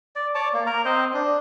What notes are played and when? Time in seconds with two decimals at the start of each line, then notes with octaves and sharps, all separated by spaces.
0.16 D5
0.35 C#5 D5 A5 D6
0.53 A#3
0.66 A#4 A#5
0.85 C4 C5 D#5
1.14 D4